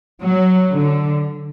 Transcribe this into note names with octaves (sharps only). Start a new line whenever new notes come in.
F#3
D3